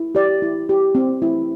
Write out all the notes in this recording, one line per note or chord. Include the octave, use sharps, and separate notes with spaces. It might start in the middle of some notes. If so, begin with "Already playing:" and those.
Already playing: E4
G4 D5
E4
G4
C4
E4